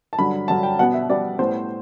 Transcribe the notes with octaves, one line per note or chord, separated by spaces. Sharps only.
A5
G2 D3 F#3 B5
G2 D3 F#3 A5
G5
B2 G3 B3 F#5
E5
B2 G3 B3 D5
A2 G3 B3 C5